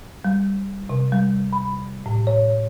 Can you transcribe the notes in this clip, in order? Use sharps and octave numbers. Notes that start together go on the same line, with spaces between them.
G3
C3
G3
B5
A2
C#5